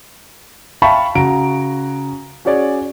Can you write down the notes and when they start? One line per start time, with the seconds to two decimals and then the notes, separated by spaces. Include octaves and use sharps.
0.82 E5 F5 G5 A5 B5 C#6
1.15 C#3 F#4 A#5 D7
2.45 C#4 F#4 G#4 C#5 D5